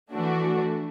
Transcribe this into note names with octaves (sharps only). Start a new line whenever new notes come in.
E3 A3 D4 F#4